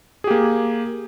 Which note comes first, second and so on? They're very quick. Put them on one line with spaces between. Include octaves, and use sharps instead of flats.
G#4 G4 A#3